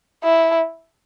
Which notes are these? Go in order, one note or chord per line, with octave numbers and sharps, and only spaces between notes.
E4